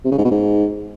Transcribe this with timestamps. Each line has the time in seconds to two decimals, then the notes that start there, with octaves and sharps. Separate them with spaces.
0.05 C3
0.11 C#3
0.18 G#2
0.24 B2
0.31 G#2